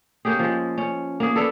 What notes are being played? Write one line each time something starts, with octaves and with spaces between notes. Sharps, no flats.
A#3 C#4 G4 G#4
F3 G#3
C#4
A#3 G#4
A4 B4 D5 F5